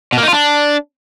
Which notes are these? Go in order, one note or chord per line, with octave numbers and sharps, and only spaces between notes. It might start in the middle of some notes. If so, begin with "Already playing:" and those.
B2
A#3
D#4
F4
D4